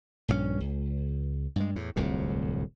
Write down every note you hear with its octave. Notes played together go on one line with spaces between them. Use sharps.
A#1 G2 F3 C#4
C#2
G2 G#3
E2 A2
D1 C2 F2 A2